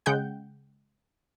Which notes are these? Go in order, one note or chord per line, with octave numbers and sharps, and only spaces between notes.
C#3 G#3 F#5 G5 G6